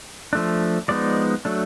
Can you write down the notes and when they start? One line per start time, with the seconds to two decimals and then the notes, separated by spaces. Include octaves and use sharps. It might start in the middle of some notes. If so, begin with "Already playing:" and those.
0.33 F3 A3 D4
0.88 F3 G#3 B3 D#4 D5
1.45 F#3 A3 D4